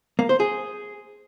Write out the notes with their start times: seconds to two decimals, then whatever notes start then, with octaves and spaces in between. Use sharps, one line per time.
0.19 A#3
0.29 C5
0.40 G#4